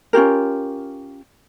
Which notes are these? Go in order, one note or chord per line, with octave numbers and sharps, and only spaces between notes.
C#4 F4 G4 A#4